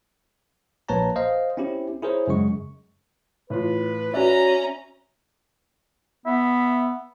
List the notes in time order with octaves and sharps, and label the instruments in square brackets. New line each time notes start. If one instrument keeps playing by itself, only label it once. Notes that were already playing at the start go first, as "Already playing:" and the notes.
[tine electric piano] A#1 A#3 B4 C#5 A5 A#5
C5 D#5 F5
C4 C#4 E4 G4
E4 G#4 A#4 C5 C#5
F#2 C#3 G#3 C#6
[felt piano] A2 E3 F4 [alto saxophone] B4
[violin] C#4 A#5 [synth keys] F#4 D5 [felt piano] E5 G#5
[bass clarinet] B3 [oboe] E5